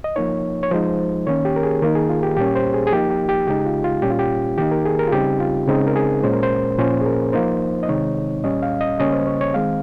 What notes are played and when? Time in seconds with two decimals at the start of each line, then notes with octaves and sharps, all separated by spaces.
0.04 D#5
0.16 F3 A#3 D#4 C#5
0.63 C#5
0.71 F3 G#3 D#4 C5
1.27 D#3 A#3 C#4 C#5
1.45 G4
1.56 A#4
1.63 G#4
1.82 D#3 A#3 D#4 A#4
1.95 G#4
2.09 F4
2.23 G4
2.37 A#2 G3 A#3 C#4 G4
2.46 C#5
2.55 C5
2.74 G#4
2.87 G#4
2.92 F3 A#3 D#4 G4
3.10 G4
3.29 G4
3.47 C#3 G#3 D#4 G4
3.66 F4
3.84 F4
4.02 A#2 G3 C#4 G4
4.11 F4
4.19 G4
4.58 D#3 A#3 D#4 G4
4.71 A#4
4.85 G#4
4.99 A#4
5.08 F4
5.12 C#3 G3 C4 D#4 G4
5.40 F4
5.68 C#3 G#3 C4 D#4
5.87 A#4
5.96 G#4
6.23 A#2 G#3 C#4 C5
6.33 A#4
6.43 C5
6.79 A#2 F3 A#3 C#4 C5
7.01 G#4
7.06 A#4
7.33 F3 A#3 D#4 C5
7.83 D#5
7.89 C3 D#3 G#3 C4 D#4 C#5
8.44 A#2 G3 C#4 D#5
8.62 F5
8.81 D#5
8.99 C#3 G3 A#3 C#4 D#5
9.13 C5
9.27 C#5
9.41 C#5
9.54 D#3 G#3 C4 F5